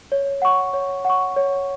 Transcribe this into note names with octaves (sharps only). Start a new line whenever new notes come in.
C#5
F#5 C#6
C#5
F#5 C#6
C#5